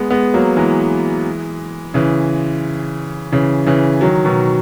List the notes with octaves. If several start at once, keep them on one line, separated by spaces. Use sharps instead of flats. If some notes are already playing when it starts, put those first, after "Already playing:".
Already playing: G#3 B3
G#3 B3
F#3 A#3
E3 G#3
C#3 E3
C#3 E3
C#3 E3
D#3 F#3
B2 D#3